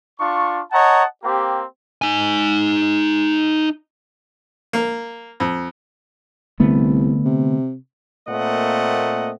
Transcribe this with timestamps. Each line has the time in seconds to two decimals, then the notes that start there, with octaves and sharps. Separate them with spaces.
0.19 D4 F4 C#6
0.72 C#5 D#5 F#5 A5 A#5
1.24 A#3 C4 G4
2.02 D#4 G#5
4.73 A#3
5.40 F2
6.60 C2 D3 A3 B3
7.25 C3
8.28 A#2 A3 A#3 C4 D#5 F#5